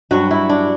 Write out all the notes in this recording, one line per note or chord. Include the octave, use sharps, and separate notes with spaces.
G2 F#3 F#4
E4
D4